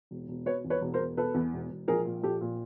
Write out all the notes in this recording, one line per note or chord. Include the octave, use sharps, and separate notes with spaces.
E1
E1
B2 B4 C#5
E2
B4 C#5
E1
A#4 C5
E1
B2 A4 B4
E2
E1
E1
A#1 G#4 A#4
A#2
A#1 G4 A4
A#2